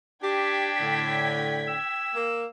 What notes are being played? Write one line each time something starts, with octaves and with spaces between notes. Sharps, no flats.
D4 G4 G5 G#6 B6
A2 D3
E6
A#3